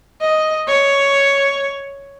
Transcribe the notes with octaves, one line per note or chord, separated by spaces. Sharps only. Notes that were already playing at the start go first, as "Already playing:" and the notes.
D#5
C#5